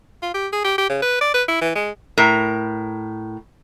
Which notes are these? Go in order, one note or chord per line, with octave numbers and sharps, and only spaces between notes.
F4
G4
G#4
G4
G4
C#3
B4
D5
B4
E4
E3
G#3
A2 A#4